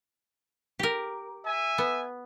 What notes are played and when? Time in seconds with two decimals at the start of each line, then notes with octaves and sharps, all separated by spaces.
0.79 G4 A#4
1.45 E5 G#5
1.78 B3